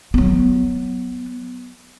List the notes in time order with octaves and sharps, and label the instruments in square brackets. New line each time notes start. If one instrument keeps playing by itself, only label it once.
[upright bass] F#3 B3